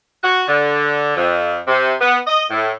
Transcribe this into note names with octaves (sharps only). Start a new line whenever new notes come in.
F#4
D3
F2
C3
B3
D#5
A2